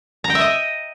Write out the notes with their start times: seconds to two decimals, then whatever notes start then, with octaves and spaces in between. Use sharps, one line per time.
0.24 A#5
0.30 G5
0.35 E5
0.40 D#5